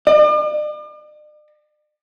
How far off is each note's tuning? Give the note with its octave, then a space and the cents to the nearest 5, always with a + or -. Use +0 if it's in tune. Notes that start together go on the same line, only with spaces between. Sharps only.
D5 +45